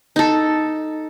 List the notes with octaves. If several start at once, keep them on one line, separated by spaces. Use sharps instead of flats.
D#4 A4